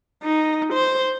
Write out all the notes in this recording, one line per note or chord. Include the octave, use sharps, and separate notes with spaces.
D#4
C5